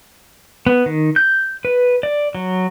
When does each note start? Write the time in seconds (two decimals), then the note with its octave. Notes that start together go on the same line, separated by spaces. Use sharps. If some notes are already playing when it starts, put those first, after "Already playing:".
0.67 B3
0.86 D#3
1.16 G6
1.65 B4
2.03 D5
2.35 F#3